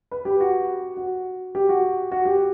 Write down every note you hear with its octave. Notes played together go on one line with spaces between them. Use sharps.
B4
G4
F#4
F#4
G4
F#4
F#4
G4